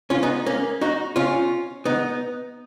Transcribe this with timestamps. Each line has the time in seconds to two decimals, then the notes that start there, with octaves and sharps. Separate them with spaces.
0.10 C#4 F4
0.23 B3 D#4
0.46 A#3 C#4
0.81 D#4 F#4
1.16 C#4 F4
1.85 B3 D#4